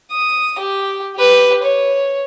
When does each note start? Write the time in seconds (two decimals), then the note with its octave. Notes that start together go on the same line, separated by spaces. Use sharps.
0.11 D#6
0.59 G4
1.15 G4 B4
1.63 C#5